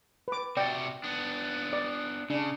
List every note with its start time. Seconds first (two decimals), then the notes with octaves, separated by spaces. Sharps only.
0.28 B4 D6
0.57 C3 F#4 D5 G5
1.04 B3 D4
1.73 D5
2.30 C#3 D4